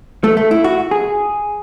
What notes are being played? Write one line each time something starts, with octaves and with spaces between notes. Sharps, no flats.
A3
A3
E4
F#4
G#4